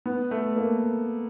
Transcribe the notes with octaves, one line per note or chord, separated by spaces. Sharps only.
B3
A3
A#3